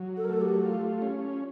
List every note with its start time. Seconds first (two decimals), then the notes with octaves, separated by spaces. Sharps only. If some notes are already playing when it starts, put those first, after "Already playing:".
Already playing: F#3
0.17 A4
0.25 A#4
0.29 A3 A4
0.41 G4
0.66 F4
1.02 C#4